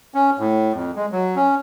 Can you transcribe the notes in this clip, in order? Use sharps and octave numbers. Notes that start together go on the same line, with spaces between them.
C#4
A2
F2
G#3
F#3
C#4